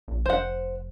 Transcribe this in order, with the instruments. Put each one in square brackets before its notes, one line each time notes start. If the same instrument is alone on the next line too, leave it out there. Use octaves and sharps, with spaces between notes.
[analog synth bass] A#1
[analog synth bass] F1 [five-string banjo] C5 F#5